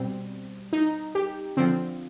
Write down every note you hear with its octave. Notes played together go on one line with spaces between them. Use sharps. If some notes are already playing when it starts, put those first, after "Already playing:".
Already playing: B2 G3 C4
D#4
G4
D3 F3 C4